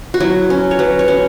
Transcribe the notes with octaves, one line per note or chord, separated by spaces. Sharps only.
F#4
F#3 E4
C#4
C#5
F#3 B4
C#5
C#4